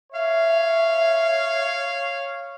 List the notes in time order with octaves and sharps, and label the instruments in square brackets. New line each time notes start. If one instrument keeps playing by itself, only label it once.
[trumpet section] C#5 F5 [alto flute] E5